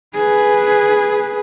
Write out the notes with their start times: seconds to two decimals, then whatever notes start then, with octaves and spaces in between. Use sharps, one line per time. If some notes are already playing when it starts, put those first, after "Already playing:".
0.14 G#4 B4